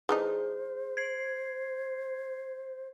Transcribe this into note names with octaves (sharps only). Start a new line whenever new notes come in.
E3 A3 D#4 G#4 C5
G#6 C7